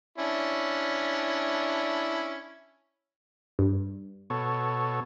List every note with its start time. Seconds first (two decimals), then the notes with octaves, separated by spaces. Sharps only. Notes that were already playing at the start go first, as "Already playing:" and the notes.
0.18 C#4 D4 E4
3.59 G2
4.30 B2 A4 C#5